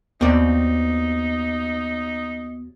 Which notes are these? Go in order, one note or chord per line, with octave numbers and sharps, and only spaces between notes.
D#2 B3 C4 D#4 F#4 D5